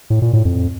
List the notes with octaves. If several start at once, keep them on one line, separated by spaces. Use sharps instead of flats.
A2
A#2
A2
F2